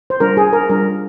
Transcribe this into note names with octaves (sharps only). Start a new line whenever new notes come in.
C5
G3 D4 F4 A#4
G#4
A#4
G3 D4 F4 A#4